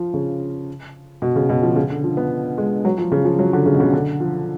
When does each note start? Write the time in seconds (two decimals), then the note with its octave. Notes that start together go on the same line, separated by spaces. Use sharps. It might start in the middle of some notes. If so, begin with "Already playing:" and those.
Already playing: F3
0.14 C#3
1.22 B2
1.36 C#3
1.49 B2
1.63 F3
1.76 C#3
1.90 D3
2.04 F3
2.17 B3
2.58 G#3
2.85 F#3
2.98 F3
3.12 C#3
3.25 F3
3.39 F#3
3.53 D3
3.66 C#3
3.74 B2
3.80 C#3
3.93 D3
4.20 F3